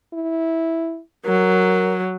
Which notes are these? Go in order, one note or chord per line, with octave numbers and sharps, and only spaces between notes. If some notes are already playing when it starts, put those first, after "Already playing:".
E4
F#3 A#4